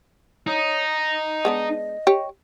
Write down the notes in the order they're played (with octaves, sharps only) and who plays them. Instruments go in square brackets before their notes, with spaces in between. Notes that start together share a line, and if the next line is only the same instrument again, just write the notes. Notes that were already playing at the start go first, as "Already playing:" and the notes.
[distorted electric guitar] D#4 [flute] C#5
[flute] D#5
[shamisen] G#3 B3 D4
G4 C#5